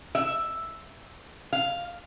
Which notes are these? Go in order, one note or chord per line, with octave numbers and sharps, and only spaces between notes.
E5
F5